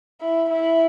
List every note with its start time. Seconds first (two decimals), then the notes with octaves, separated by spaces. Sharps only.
0.21 E4
0.49 E4